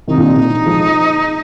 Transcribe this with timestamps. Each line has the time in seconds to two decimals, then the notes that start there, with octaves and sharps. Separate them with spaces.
0.08 C3 D#3 D#4
0.18 A#2 D3
0.27 C3
0.36 A#2
0.65 F3 G#3